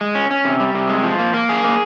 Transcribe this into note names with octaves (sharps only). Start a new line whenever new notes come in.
G#3
C#4
C#4
C3
G3
C3
G#3
F3
A#3
A#3
G#4
A#3